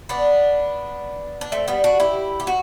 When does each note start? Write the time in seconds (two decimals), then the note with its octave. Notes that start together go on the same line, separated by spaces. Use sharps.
0.09 B3 D4
1.41 D4
1.52 A3 C4
1.68 G3 B3
1.84 D4 F#4
2.00 E4 G4
2.40 G4
2.47 F#4